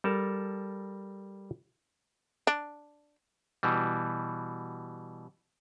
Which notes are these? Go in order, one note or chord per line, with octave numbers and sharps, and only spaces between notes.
G3 A4 A#4 A5
D4
B2 E3 G3